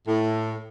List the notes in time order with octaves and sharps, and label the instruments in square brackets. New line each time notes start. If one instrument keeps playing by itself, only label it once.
[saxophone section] A2